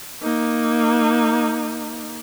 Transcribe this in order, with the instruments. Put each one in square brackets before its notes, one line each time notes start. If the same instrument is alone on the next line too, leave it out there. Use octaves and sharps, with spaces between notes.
[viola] A#3 D#4